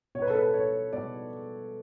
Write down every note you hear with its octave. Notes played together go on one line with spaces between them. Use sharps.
B2 C#5
B4
A4
B4
C#5
B2 D5